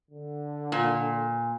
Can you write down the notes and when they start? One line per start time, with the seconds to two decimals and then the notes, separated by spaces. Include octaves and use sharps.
0.11 D3
0.72 A#2